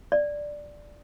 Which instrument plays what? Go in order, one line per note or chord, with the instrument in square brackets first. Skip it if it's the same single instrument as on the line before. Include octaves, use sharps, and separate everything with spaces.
[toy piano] D5